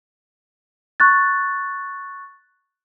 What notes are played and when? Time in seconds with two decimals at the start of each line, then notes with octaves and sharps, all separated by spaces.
1.00 C#6 F#6 A6